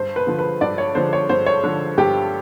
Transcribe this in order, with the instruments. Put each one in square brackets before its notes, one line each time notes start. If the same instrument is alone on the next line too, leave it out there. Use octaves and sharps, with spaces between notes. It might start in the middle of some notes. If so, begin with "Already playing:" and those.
Already playing: [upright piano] G2 C5
B4
D3 F3
B4
G2 D5
C#5
D3 F3 C5
C#5
G2 C5
C#5
D3 F3
G2 G4